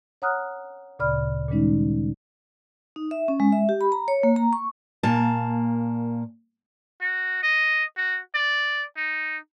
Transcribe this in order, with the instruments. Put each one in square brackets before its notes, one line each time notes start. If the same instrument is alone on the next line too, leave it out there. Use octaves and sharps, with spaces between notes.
[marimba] C#5 F#5 A#5 D#6 F6 F#6
D2 A#2 C#3 D5 B5 F6
A#2 D#3 G3 G#3 C#4 D#4
[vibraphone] D#4
E5
C#4
G#3
E5
G4
B5
A#5
C#5
A#3
A#5
C#6
[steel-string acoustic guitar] A#2 A#3 A5
[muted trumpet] F#4
D#5
F#4
D5
D#4